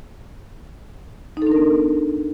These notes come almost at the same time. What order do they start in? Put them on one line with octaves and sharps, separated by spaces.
D#4 A4 D4 A#4 B3